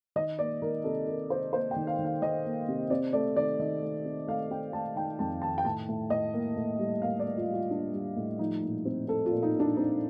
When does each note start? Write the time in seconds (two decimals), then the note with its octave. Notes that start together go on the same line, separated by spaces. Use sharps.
0.16 D#3 D#5
0.39 A#3 D5
0.62 D#3 A#4
0.84 C3 A4
1.07 C3 A#4
1.30 C3 C5
1.53 A#3 C5
1.71 G5
1.76 D#3
1.87 F5
1.99 D#3
2.05 F5
2.22 D#3 D#5
2.45 A#3
2.68 C3
2.90 C4 D5
3.13 A3 D5
3.36 D#3 D5
3.59 D#3 D#5
3.82 A3
4.05 C4
4.27 A3 F5
4.50 C4 G5
4.73 A3 A5
4.96 D#3 G5
5.19 F2 A5
5.42 D#3 A5
5.58 G5
5.65 A2 A5
5.89 A2
6.10 A2 D#5
6.34 A#3
6.57 A2
6.79 G3
7.02 A#3 F5
7.20 D5
7.26 A#3
7.37 F4
7.48 G3
7.53 F4
7.71 A#3 D4
7.94 G3
8.16 A2
8.39 F3 D#4
8.62 A#2
8.85 C4
9.08 C4 A4
9.26 F4
9.31 A#2
9.43 D#4
9.55 A#2
9.60 D4
9.77 C4 D#4